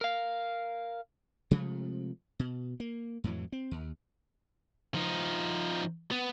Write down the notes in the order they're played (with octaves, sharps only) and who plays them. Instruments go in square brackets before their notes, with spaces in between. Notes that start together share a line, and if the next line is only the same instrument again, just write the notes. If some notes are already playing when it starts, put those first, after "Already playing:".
[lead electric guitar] A#4 F5
[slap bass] C3 F3 G#3 A3
B2
A#3
F2 A2 E3 F#3
C4
D#2
[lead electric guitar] F3 D#4
B3